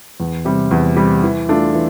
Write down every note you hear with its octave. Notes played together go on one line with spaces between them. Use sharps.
E2
C3 G3
E2
C3 G3
E3
A3 D4 F4
E3